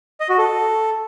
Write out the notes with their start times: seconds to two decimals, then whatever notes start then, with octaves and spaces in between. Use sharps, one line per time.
0.20 D#5
0.29 F#4
0.38 A4